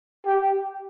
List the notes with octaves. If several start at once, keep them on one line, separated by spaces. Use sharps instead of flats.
G4